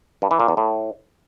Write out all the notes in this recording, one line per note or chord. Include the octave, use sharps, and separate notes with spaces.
G2
E3
A#2
E2
A2